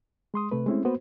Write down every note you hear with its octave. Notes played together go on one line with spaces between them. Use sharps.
G#3 C6 D#6
C3 A3 B4
G#3 A3 C4 C#4 E4
A#3 B3 F#4 B4 C5